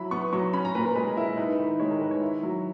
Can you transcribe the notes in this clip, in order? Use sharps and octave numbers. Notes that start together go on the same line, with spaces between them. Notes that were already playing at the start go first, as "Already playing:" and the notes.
Already playing: F#3 E4 B5
B3 C#6
F#3 C#6
C#4 B5
A#5
A#2 B4
A#4
G#3 B4
E4
D#4 B4
D#3
G#3 C#5
A#4
D#3 B4
C#5
E4
F#3